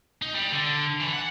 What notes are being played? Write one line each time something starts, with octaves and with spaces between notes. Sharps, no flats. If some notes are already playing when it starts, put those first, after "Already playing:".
D#4
G3
D3
E3
F#5